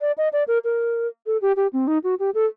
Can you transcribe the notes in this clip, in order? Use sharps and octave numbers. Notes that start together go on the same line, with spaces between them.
D5
D#5
D5
A#4
A#4
A4
G4
G4
C4
D#4
F#4
G4
A4